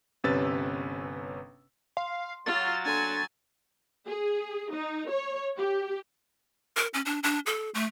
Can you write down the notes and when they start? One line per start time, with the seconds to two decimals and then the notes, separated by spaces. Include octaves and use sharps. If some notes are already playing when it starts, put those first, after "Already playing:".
0.24 G1 C3 C#4 B4 E6 A6
1.97 F5 C6
2.46 F#3 F4 A6
2.86 D4 A4 G#5 C6
4.07 G#4
4.72 D#4
5.11 C#5
5.58 G4
6.76 A#4
6.94 C#4
7.05 D4
7.23 D4
7.46 A4
7.74 A3